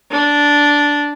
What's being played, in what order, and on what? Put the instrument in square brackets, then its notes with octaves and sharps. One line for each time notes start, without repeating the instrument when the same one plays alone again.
[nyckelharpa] D4